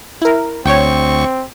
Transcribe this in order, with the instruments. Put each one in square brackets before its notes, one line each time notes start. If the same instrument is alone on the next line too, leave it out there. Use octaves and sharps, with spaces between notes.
[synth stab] E4 A#4
[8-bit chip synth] D2 C#6 [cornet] C4 [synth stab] C#5 G5